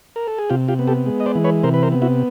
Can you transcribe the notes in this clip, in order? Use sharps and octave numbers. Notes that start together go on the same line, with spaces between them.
A#4
A4
G#4
C3 F4 G4
F4 G4
B3
G4 A4
G#3
D#5
C5 D5
E3
B4 C#5
C3 A#4 C5
B4
A#4 C5
B3
E4 F#4